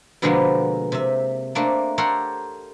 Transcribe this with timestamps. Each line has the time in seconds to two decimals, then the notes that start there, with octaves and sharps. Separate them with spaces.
0.22 B2 D3 F3 G#3 A#3 B3
0.92 C3 E5
1.55 A3 A#3 C4 D4
1.98 G4 A4 A#4 C5 C#5 F#5